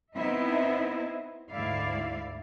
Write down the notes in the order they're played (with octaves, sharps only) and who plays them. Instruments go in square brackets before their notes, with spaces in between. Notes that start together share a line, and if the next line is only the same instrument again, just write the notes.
[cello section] B3 C4 D#4 E4 D#5 E5
D2 G#2 E4 D5 F5